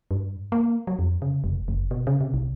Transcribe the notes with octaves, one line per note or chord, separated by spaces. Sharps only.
G2
A#3
F#3
F2
C#3
F1
F#1
B2
C#3
C3
C2